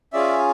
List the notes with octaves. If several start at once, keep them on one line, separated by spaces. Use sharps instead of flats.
C#4 F4 G#4 D5 E5